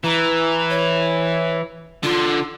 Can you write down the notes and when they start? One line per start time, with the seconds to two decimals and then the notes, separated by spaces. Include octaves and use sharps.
0.04 E3 A#5
0.69 C#5
2.03 D3 F4 C6